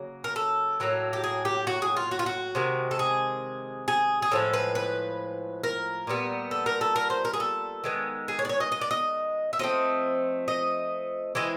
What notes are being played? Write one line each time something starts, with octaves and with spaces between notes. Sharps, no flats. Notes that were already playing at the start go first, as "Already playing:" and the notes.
Already playing: C#3 F#3 A#3
A#4
A4
A2 F#3 A#3
G4
G#4
G4
F#4
G#4
F4
F#4
F4
F#4
C3 D#3 G#3
A4
G#4
G#4
G#4
A2 F3 G#3 A4
B4
B4
A#4
A#2 G3 B3
A4
A#4
A4
A#4
C5
A#4
G#4
A4
D#3 G#3 B3
G#4
C#5
D5
C#5
D#5
D#5
D5
D#5
E5
F3 A3 C4 D#5
D#5
E3 G#3 C4 E4 D#5